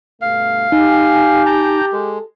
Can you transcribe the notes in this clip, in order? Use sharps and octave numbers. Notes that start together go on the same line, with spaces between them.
G2 B2 A3 F5
D#4 G4 G#5
G5 A5 A#5
G#3 A4